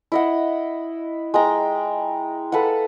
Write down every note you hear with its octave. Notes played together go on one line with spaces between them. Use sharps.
E4 D#5 F#5
G#3 G5 A#5
A4 B4 F5 F#5